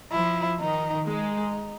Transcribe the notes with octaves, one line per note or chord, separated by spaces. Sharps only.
F3 E4
D#3 D#4
G#3 D#4